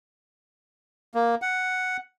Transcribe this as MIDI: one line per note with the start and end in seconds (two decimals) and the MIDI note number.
1.15 1.35 58
1.42 1.97 78